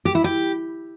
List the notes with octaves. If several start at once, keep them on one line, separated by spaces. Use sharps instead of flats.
G4
E4
G4